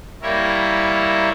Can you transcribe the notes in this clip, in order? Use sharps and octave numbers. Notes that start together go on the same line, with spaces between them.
G3 A#3 E4 A#4 C#5 E5